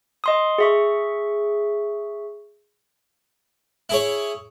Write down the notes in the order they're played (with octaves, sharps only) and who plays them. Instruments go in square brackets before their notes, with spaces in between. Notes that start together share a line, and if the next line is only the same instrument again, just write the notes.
[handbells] D#5 C6 D#6
G#4 E5 C#6
[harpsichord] E4 G#4 C#5